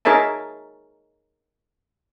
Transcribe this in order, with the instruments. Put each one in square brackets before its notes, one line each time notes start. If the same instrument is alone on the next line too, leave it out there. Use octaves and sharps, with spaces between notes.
[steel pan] D#4 G#4 A#4 C#5 E5 A5